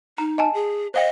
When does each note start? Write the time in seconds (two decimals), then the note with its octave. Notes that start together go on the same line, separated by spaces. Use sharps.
0.18 D#4 A#5
0.38 D#5 G#5 A5
0.54 G#4
0.94 C5 D#5 F5 G5